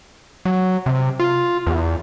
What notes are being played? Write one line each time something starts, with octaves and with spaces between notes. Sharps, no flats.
F#3
C3
F4
E2